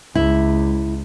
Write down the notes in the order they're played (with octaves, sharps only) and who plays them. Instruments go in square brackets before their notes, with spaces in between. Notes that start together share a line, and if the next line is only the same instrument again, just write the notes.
[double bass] C#2 [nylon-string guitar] E4